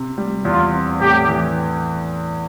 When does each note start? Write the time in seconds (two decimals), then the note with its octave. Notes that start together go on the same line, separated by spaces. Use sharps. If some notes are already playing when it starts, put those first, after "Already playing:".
Already playing: C3
0.18 G3
0.45 E2 F4
0.72 C4
1.00 A2 G4
1.27 E3